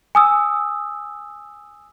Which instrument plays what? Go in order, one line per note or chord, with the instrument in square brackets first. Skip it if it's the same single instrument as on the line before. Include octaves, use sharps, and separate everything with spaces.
[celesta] G#5 D#6 E6